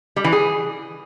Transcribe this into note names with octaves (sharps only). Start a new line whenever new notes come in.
G3
E3
G#4